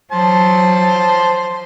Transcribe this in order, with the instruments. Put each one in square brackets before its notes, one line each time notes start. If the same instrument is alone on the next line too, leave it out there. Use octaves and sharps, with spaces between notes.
[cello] F#3 [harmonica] C5 A5